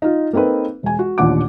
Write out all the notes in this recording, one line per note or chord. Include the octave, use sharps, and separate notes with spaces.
D#4 F4
A#3 C4 D#4 A4 B4
E1 G#5
F#4
A1 D#2 A#2 D4 F#5 D6